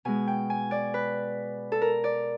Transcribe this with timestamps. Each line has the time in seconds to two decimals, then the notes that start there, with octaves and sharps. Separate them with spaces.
0.05 B2 G#3 G#5
0.27 G5
0.50 G#5
0.71 D5
0.94 B4
1.72 A4
1.81 A#4
2.04 D5